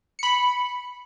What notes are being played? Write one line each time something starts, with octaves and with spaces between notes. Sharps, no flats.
B5 C#7